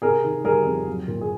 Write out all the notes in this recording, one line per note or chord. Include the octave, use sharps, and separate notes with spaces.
C3 G#4 A#4
D#3
G3 G#4 A#4
F2
F#3
A#2
G#4